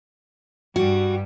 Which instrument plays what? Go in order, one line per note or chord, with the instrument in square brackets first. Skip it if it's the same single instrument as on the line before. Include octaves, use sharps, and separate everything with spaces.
[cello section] G2 G3 [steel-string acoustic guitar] F#4